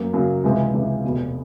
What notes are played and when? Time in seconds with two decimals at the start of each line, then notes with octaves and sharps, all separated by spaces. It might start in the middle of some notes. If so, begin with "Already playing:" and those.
Already playing: F#2 F#3 A#3
0.13 F#2 C#3 F#3 A#3
0.44 C#2 C3 E3 G#3
0.73 C#2 C3 E3 G#3
1.04 F1 E2 B2